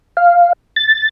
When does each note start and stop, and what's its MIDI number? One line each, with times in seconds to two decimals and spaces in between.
0.17 0.53 77
0.76 1.09 93